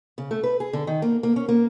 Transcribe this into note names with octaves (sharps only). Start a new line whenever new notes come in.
C#3
A3
B4
G#4
D3
D#3
A#3
A#3
C#4
A#3